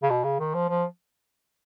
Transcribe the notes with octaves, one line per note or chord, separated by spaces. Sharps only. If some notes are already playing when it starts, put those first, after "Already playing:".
C#3
B2
C#3
D#3
F3
F3